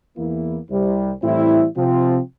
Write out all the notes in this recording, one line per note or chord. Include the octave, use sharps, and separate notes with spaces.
E2 E3 A#3 E4
C2 C3 G3
A2 E3 G3 C4 E4
C3 F3 C4 F4